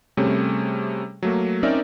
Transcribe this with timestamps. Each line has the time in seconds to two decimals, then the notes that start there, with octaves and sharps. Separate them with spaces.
0.17 C3 G3 A3 C#4 G#4 C#5
1.23 F#3 A3 A#3
1.63 C4 C#4 D#4 A#4 D5 E5